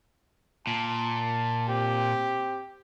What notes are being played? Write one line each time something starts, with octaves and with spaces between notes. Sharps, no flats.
A#2 A5
C4 G4